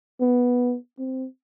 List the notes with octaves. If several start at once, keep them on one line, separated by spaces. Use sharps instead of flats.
B3
C4